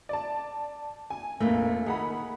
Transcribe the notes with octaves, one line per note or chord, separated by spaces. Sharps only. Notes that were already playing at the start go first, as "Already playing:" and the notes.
D5 A5
G#5
F1 A#1 A3 A#3
D#3 G#4 F#5 B5